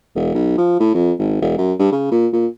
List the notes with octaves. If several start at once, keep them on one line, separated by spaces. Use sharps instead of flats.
E1
B1
F3
A2
F2
G#1
E1
F#2
G2
C#3
A#2
A#2